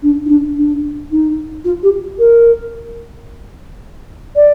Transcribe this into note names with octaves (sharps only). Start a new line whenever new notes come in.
D4
D#4
D4
D4
D#4
F4
G4
A#4
D5